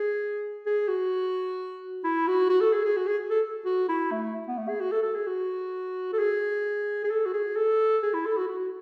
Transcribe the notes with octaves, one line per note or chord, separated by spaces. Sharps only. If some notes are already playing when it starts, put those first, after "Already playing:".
Already playing: G#4
G#4
F#4
E4
F#4
F#4
A4
G#4
G#4
F#4
G#4
A4
F#4
E4
A3
B3
A3
G#4
F#4
A4
A4
G#4
F#4
A4
G#4
G#4
A4
F#4
G#4
A4
G#4
E4
A4
F#4
F#4